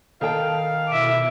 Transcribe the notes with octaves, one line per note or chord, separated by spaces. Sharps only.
D#3 A4 F5 G5
B2 E4 E5 D6